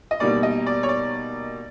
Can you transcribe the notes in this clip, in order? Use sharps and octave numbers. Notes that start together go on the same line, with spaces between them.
D#5
B2 G3 A#3 D#4 D5
D#5
D5
C#5
D5